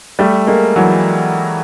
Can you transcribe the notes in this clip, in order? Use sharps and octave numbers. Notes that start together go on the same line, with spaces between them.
G3 A3
G#3 A#3
E3 F#3